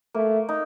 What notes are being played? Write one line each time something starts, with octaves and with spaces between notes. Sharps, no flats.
A3 A#3
D#4